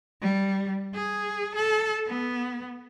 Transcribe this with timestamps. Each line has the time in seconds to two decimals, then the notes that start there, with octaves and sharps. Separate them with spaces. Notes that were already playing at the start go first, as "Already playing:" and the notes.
0.22 G3
0.94 G#4
1.55 A4
2.07 B3